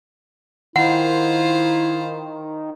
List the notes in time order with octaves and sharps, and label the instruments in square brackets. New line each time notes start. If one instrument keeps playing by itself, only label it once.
[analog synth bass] D#3 [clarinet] E4 [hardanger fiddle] F4 C5 [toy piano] F#5